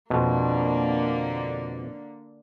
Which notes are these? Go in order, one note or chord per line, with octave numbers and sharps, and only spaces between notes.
F2 B2 D3 A#3